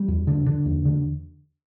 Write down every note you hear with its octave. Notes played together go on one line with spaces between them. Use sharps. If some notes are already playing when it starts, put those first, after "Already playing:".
Already playing: G3
E2
D3
D3
E2
D3